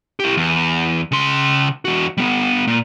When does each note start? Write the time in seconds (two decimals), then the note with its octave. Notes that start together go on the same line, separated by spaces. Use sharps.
0.20 E4 G4
0.37 E2
1.12 C#3 C6
1.85 E2 F#4
2.17 G3 B3
2.67 A#2